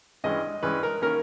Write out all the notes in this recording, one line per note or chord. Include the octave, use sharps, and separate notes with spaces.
G2 E3 G#3 C#4 D#5
G2 E3 G#3 C#4 B4
A#4
D#3 A#3 C#4 A#4